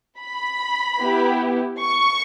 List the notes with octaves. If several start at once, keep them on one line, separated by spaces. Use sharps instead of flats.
B5
B3 E4 G4
C#6